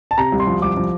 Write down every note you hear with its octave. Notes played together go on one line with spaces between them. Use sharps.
A5
C3 A#5
C2
C6
F3
C2 D6
F3